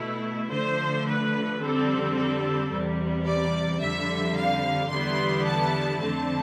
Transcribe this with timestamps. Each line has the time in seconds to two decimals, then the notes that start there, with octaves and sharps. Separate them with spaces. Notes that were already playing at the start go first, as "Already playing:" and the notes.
Already playing: B2 A3 E4
0.51 D3 F3 A3 C5
1.06 B4
1.61 F2 D3 G3 C4 A4
2.16 A4
2.71 E2 C3 G3
3.26 D5
3.80 F2 D3 G3 E5
4.35 F5
4.90 E2 D3 G3 B3 E4 C6
5.45 A5
6.00 F2 D3 A3 C4 A5